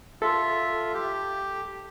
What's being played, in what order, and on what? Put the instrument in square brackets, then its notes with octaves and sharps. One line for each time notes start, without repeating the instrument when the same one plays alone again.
[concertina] F4 E5 [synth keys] A4
[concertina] G4